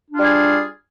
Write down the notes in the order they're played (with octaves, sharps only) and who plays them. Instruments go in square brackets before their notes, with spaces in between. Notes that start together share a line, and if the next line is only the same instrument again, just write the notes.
[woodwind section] D4
F4
G3
G#4